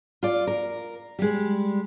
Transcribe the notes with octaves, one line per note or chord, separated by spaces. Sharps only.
F4 D5
A#4
G3 G#3